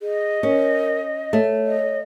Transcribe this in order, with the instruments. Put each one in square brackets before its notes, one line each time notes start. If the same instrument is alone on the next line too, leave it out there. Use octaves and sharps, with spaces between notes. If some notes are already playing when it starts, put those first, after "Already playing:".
[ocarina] G#4 [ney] D#5
[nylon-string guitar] C#4 [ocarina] A#4
[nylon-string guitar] A3 [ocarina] C#5
[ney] D#5